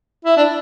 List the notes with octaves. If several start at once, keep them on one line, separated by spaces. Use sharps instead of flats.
E4
D4